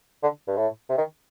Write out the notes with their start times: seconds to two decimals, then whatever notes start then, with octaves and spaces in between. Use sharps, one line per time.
0.23 D3
0.47 G2
0.57 A2
0.89 C3
0.98 D#3